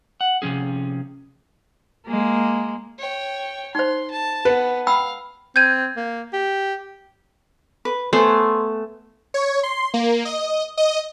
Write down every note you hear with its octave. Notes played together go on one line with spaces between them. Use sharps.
F#5
C3 F3 C#4 G#4
G#3 A#3
C#5 G5
D#4 C5 C6
A5
B3 B4
F5 G5 B5 E6
C4 G6 G#6 D#7
A#3
G4
B4
A3 B3 C5 G#5
C#5
C6
A#3
D#5
D#5